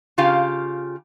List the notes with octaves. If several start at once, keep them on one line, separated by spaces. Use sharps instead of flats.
C#3 F4 G4 F5